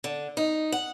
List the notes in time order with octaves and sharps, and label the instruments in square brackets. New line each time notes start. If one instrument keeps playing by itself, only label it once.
[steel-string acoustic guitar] D3
D#4
F#5